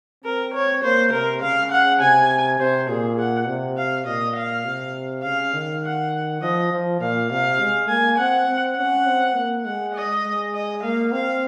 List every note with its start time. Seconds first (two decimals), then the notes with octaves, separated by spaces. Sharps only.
0.24 C4 A#4
0.54 C#5
0.84 A#3 C5
1.12 C3 A#4
1.42 C#3 F5
1.72 F#5
2.01 C3 G#5
2.60 C3 C5
2.89 A#2 G#4
3.19 F#5
3.48 C3
3.77 F5
4.07 A#2 D#5
4.36 F5
4.66 C3
5.24 C#3 F5
5.54 D#3
5.83 F#5
6.41 F3 D#5
6.72 F3
7.01 A#2 F5
7.30 C3 F5
7.60 G#3
7.89 A#3 G#5
8.18 C4 F#5
8.48 C4
8.77 C#4 F#5
9.06 C4
9.36 A#3
9.65 G#3 F#5
9.95 D#5
10.24 G#3
10.54 D#5
10.83 A#3 F5
11.12 C4 F5